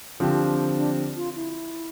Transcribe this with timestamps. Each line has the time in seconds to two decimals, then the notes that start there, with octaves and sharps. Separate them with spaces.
0.20 D3 F3 C4 F4 G4
0.77 D4
1.16 F4
1.36 E4